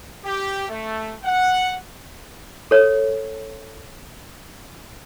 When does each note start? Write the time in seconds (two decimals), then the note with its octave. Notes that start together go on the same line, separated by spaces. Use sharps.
0.25 G4
0.69 A3
1.24 F#5
2.71 A4 C#5